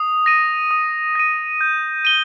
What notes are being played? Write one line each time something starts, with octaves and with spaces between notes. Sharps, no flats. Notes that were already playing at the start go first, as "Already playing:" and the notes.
Already playing: D#6
A#6 D#7
D#6
A#6 D#7
G6
D#7 G7